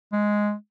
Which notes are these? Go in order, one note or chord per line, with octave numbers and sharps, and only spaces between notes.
G#3